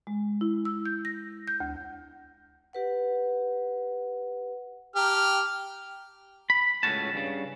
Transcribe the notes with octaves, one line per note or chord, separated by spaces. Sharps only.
G#3
E4
E6
G6
A#6
G6
D2
G4 B4 F#5
G4 A5 A#5 F6
B5
C#2 A2 C#4 F#4 A5
G2 C#3